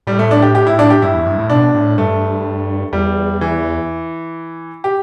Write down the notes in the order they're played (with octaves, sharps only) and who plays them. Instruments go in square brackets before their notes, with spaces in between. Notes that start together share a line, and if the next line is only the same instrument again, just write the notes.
[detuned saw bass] A2 [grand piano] G3
[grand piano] A3
D4
G4
G4
E4
D4
G4
[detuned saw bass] G2 [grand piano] E4
[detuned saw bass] E2
G2
A2
[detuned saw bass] B2 [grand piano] D4
[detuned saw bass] A2
[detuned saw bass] G2 [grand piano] A3
[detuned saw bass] E2 [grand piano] G3
[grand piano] E3
G4